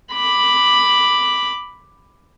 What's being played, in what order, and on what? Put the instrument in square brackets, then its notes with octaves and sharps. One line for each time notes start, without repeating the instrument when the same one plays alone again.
[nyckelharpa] B5 D6